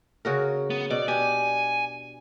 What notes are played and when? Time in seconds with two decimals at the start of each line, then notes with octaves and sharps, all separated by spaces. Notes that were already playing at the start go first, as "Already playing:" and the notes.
0.25 C#3 F#4 A#4
0.70 B3
0.91 B2 D5
1.08 D4 G4 G#5